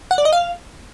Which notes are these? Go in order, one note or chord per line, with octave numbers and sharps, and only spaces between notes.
F#5
D5
D#5
F5